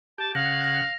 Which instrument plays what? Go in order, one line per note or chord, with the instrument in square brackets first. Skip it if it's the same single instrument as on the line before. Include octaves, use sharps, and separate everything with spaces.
[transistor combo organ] G4 [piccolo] A5
[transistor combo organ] C#3 F#5 [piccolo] F5 [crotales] A#6
[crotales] A#6